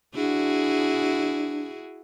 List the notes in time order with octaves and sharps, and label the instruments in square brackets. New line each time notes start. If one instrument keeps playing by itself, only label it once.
[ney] D4 [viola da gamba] E4 F#4 G#4